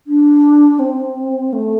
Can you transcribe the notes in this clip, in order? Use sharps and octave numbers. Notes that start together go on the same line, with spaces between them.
D4
C4
A3